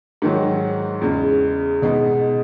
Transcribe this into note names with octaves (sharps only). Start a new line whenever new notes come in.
G#2 D#3 F#3
E2 C#3 G#3
B2 G#3 B3 D#4